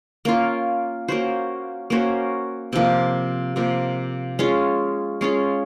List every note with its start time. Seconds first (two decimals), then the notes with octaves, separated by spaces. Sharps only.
0.25 A#3 C#4 F4
1.08 A#3 C#4 F#4 C5
1.90 A#3 C#4 F#4 C5
2.73 C3 F3 A#3
3.56 C3 F3 A#3
4.39 G#3 C#4 F4
5.21 G#3 C#4 F4